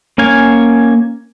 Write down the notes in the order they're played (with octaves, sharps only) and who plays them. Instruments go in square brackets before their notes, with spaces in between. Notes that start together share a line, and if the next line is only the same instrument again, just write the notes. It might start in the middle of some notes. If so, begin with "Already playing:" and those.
[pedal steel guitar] A#3 C#4 F5 G#5